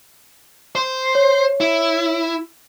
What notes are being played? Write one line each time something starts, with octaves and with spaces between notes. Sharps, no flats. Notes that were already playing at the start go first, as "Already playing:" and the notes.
C5
C#5
E4